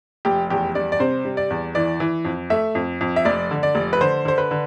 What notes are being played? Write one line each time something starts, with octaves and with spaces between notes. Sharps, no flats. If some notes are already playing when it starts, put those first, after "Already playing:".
F1 G4
E2 G4
G3 D5
D5
C3 C5
G3
D5
E2
E3 D5
E3
F2
A3 E5
F2
F2
E5
F1 D5
D3
D5
F1
B4
D3 C5
D3 C5
B4
D3